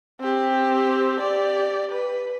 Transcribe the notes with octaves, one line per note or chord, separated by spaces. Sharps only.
C4 G4
G4 D5
B4